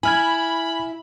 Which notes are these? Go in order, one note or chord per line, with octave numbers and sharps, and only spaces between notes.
E4 G#5 B5 F6 G#6